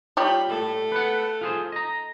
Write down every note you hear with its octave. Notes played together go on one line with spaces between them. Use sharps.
G3 F4 G4 C#5 B5
A2 A3 A4
B4 F#5
F4 G#4 C5
D#5 A#5